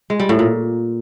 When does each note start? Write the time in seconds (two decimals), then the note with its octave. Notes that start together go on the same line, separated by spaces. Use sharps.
0.10 G#3
0.20 G3
0.29 A2
0.39 A#2